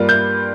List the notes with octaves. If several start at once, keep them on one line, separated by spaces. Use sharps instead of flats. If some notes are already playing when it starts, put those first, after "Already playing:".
Already playing: G2 G3 A#3 F4
G6